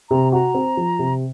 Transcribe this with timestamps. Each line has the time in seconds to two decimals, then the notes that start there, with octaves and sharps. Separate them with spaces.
0.10 C3 A#5
0.32 F#4 A#5
0.54 C4
0.77 F3
0.99 C3